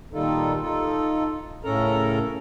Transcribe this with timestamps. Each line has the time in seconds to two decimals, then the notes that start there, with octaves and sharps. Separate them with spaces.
0.13 A#2 D#3 G3 D#4 F4 A4
0.62 D#4 F4 A4
1.64 A2 C#3 C#4 A4 A#4 A#5